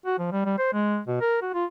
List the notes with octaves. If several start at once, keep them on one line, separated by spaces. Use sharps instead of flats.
F#4
F3
G3
G3
C5
G#3
B2
A#4
F#4
F4